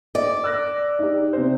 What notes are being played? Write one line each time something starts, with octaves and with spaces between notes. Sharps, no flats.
D5 D#5
E6 F#6 A#6
D#4 G4
C3 C5